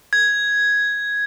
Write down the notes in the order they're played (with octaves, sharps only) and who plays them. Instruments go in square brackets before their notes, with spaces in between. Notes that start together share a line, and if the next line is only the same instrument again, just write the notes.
[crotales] G#6